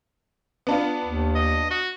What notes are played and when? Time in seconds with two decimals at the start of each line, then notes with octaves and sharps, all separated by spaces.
0.67 B3 D4 F4
1.05 D#2
1.35 D#5
1.71 F#4